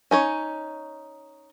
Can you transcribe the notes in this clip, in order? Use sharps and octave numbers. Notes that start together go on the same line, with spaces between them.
C#4 D#4 C#5